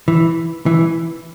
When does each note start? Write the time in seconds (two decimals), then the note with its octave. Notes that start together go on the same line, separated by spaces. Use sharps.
0.08 E3
0.66 E3